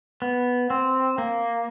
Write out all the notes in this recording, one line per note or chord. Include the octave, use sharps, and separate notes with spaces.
B3
C4
A#3